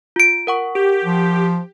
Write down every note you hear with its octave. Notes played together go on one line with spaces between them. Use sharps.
F4 D7
A#4 F#5 C#6
G4
F3